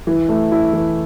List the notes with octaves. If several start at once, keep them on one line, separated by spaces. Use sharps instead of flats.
E3
A3
E4
E3